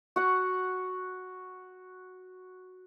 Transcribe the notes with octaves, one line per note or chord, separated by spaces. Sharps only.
F#4 F#5